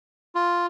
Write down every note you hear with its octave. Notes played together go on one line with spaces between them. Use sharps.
F4